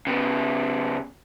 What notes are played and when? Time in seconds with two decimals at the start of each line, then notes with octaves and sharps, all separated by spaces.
0.07 C#3 B3